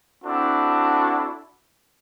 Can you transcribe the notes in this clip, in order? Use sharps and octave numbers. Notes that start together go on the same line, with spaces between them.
C4 D4 E4 F#4 A4